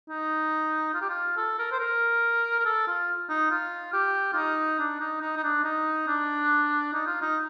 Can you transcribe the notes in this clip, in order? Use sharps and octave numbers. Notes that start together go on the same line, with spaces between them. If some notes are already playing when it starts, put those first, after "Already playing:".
D#4
F4
G4
F4
A4
A#4
C5
A#4
A#4
A4
F4
D#4
F4
G4
F4
D#4
D4
D#4
D#4
D#4
D4
D#4
D4
D#4
F4
D#4